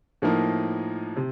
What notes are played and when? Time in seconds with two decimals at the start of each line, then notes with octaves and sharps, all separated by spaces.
0.22 A2 F3 A#3 D#4
1.16 C3